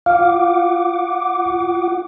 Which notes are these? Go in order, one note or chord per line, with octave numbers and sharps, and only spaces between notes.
F4 F5 F#5 D6